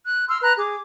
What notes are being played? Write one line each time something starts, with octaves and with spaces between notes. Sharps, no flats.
F#6
C6 E6 F6
B4 A#5 F#6
G#4 D6